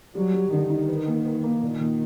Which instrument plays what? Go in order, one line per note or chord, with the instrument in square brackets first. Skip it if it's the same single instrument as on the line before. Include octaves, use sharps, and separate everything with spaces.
[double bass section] F#3 [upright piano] G3
[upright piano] G3
[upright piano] D3 [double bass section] D#3
[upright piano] D#4
B4
A#3
B4
A#3
[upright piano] A#2 [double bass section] D#3
[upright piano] A#2